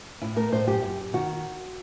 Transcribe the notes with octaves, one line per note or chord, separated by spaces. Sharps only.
A2 E4
A3 A#4
A2 C5
F#2 G4
F#2
F#2
D#3 F#4